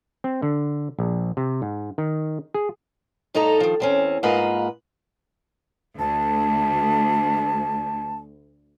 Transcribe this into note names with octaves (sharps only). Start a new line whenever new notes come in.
C4
D3
A#1
C3
G#2
D#3
G#4
G2 D#4 A4 D#5 A#5
D#3 F3
E2 C4 C#4
G#2 A#3 F4 A#4 B4 D#5
D2 A5